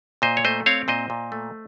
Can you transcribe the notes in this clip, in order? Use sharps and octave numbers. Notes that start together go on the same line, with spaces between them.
A#2 C5 D#5
C#5
A3 C5 D#5
C4 C#5 F5
A#2 C5 D#5
A#2
A3